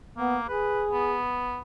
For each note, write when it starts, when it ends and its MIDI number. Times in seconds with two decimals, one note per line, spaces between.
0.17 0.44 58
0.17 0.37 59
0.48 1.17 68
0.48 0.83 71
0.91 1.59 59